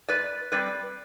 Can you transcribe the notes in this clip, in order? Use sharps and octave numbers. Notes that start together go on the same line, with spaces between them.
G#2 B4 D5
G3 C4 B4 D5